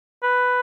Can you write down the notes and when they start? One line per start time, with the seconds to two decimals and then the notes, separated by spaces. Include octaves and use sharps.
0.23 B4